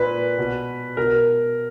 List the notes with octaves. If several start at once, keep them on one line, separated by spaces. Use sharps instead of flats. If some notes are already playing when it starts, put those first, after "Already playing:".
Already playing: A#2 B4
B2
B2 A#4